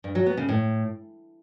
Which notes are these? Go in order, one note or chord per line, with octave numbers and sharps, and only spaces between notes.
G2
F#3
B3
C#3
A2